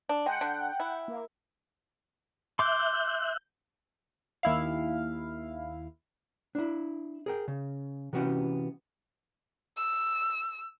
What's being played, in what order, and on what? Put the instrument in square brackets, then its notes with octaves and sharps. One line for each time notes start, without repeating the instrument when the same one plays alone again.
[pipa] D4
[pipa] G#3 [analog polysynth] F#5 G5
[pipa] D3
E4
[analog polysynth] A#3
[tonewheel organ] E5 F#6 [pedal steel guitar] C6 D6 [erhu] G6
[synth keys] D#2 E4 F5
[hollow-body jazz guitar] D4 E4
G#4 A#4 G5
C#3
C3 E3 B3 C#4 F#4 G5
[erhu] E6